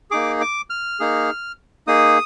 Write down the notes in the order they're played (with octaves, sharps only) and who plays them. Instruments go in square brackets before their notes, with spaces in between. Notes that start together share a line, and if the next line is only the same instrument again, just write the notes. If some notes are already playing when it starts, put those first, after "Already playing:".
[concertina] A#3 D#4 G#4 D6
D6
F6
A#3 D#4 G#4
A#3 D#4 G#4 D#6